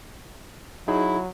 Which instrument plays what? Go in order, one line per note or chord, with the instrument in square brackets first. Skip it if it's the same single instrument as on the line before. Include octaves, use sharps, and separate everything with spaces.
[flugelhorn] F#3 [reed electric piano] D#4 G#4 [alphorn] E4